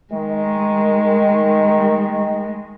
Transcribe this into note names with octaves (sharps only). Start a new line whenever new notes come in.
D#3 G#3